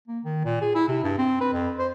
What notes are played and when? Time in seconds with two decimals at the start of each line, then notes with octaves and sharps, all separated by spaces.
0.08 A#3
0.24 D#3
0.45 A#2
0.61 G#4
0.75 E4
0.88 C3
1.04 G2
1.18 C4
1.41 B4
1.53 F2
1.79 C5